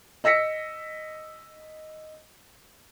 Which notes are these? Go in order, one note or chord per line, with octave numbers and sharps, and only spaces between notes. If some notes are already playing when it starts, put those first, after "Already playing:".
D#5 E6 A#6 B6 C#7